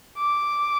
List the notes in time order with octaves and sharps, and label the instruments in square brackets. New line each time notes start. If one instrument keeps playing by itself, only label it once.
[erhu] D6